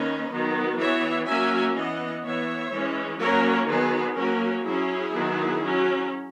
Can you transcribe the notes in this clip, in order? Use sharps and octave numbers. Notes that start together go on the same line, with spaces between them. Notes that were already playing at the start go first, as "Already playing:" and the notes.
Already playing: D#3 A#3 C#4 B4 D#5
D#3 F#3 B3
E3 B3 C#5 E5
F#3 A#3 C#4 E5 G#5
E3 B3 D#5 F#5
E3 B3 C#5 E5
E3 G#3 C#4
F#3 A#3 C#4 A#4 C#5
D#3 F#3 B3 G#4 B4
F#3 A#3 C#4 F#4 A#4
F#3 C#4 E4 G#4
D#3 F#3 B3
F#3 C#4